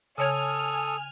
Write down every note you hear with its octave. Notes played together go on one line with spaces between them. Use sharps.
C#3 A4 C#5 G#5 D#6 F6 G#6